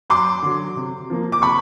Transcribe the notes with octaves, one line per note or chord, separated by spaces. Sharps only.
F#2 C6 D6
D3 F#3
C3
F3 A#3
D6
C3 B5 C#6